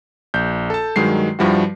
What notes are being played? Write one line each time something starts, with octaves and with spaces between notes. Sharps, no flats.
A#1 G6
A4 A5
G2 D#3 F#3 G#3 C7
G2 F3 G3 E4 F#4